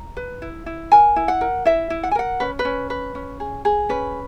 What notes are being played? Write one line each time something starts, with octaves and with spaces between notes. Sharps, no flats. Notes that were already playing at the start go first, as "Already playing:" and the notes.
Already playing: A#5
B4
E4
E4
A#4 G#5
E4
F#5
A#4
E4 E5
E4
F#5
G#5
A#4 F#5
C#4 B4
B4
C#4
B4
C#4
G#4
G#4
C#4 B4